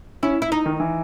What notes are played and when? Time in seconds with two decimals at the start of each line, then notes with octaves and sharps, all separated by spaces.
0.23 C#4 E4
0.42 E4
0.52 D#4
0.66 D#3
0.80 E3